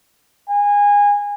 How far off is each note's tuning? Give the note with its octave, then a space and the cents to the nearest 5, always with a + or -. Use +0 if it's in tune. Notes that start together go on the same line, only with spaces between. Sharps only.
G#5 -25